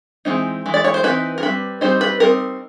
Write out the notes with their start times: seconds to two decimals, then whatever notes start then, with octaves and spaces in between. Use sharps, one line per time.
0.25 E3 G#3 C4 D#4
0.66 E3 G#3
0.74 D5
0.84 C#5
0.94 C5
1.03 E3 G#3 C4 D#4 B4
1.38 A#4
1.43 G3 C4 D#4 B4
1.81 G3 C4 D#4 C5
2.01 B4
2.20 G3 C4 D#4 A#4